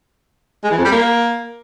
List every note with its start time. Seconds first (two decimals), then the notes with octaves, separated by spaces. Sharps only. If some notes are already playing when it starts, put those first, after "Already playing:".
0.64 G#3
0.71 E3
0.78 F2
0.85 G3
0.92 A#3